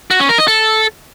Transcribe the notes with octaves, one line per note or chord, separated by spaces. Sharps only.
F#4
C#4
A#4
D#5
A4